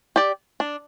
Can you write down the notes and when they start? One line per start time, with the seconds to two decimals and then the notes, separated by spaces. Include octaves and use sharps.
0.16 G4 D5
0.60 D4